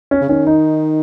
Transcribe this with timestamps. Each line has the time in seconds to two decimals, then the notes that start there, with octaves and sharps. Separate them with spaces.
0.11 C#4
0.21 C#3
0.29 D#3 C#4
0.47 D#4